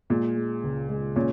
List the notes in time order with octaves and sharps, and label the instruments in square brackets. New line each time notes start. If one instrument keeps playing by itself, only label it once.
[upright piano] A#2 [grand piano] G#3
[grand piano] G#3
C#2
G#3
[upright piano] A#2 [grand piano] C#4